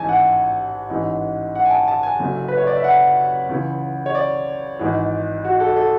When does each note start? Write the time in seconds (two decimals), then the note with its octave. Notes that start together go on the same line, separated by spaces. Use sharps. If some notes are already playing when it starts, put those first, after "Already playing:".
Already playing: A1 G#2 E3 G#5 A5
0.09 F#5
0.90 A1 G#2 E3
1.55 F#5
1.65 G#5
1.70 A5
1.88 A5
2.03 G#5
2.19 F#1 F#2 D3
2.48 B4
2.57 C#5
2.67 D5
2.76 E5
2.84 F#5
3.49 C#2 C#3 E3
4.06 C#5
4.15 D5
4.79 G#1 G#2 E3
5.45 F#4
5.60 A4
5.76 A4